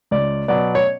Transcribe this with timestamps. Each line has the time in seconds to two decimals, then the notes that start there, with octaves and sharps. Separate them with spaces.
0.11 C#2 D5
0.48 B2 F#3 B3 D5
0.75 C#5